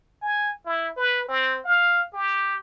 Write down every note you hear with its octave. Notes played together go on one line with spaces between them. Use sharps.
G#5
E4
B4
C4
F5
G4